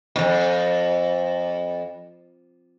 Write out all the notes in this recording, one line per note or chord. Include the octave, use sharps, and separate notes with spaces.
F2 B2